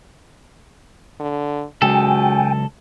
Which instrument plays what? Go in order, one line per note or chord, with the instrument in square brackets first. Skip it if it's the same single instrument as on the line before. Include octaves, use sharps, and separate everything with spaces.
[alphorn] D3
[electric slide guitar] C#3 F#3 G#3 [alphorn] F#4 [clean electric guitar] A4 [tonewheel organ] G5 G#5